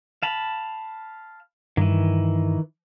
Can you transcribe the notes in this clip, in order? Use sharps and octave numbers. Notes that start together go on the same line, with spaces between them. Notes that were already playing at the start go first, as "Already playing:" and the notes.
F5 A5 B5
G2 D#3 E3